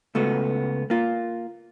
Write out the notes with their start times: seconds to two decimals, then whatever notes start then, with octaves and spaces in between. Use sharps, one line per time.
0.15 C#2 A3 B3 F#4
0.90 A#3 F4